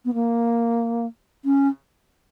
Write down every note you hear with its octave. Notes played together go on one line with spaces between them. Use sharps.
B3
A#3
C#4